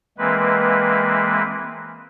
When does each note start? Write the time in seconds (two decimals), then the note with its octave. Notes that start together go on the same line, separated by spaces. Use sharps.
0.18 E3 G#3 A#3 C4 B4